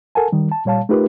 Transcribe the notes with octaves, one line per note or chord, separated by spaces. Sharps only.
A4 A#4 F#5 G#5 A5
D#3 G3
A5
A#2 G3 C#5 F5 A5
A3 D#4 F4 G4 A#4 B4